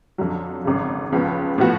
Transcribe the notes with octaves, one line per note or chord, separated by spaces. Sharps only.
F2 D3 F#3
G#1 F#2 C#3
C#2 C#3 F3 B3
A2 F3 B3 F#4